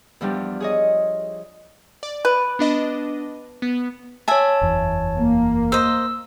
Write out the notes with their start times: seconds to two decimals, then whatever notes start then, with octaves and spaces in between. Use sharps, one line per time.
0.21 E2 F3 G3 D4 G4
0.60 G#4 C#5 D#5
2.03 D5
2.25 B4
2.59 B3 D4 D#5
3.62 B3
4.28 C#5 E5 G#5 A5
4.61 F#1 E2
5.16 A#3
5.72 C5 D#5 E6